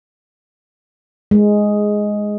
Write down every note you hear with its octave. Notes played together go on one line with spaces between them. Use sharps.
G#3